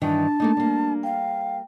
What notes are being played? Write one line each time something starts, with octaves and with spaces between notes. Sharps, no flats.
G2 D#3 E3 D4 A5
A3 A#3 D#4
G3 A#3
F5 G5